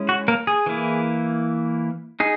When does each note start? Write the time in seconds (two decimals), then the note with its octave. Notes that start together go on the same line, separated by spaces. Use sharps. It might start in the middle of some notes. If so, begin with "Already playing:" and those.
Already playing: G#3 C#4 E4
0.09 F#4
0.28 A#3 A#4
0.47 G#4
0.66 E3 A#3 E4
2.20 D#4 G#4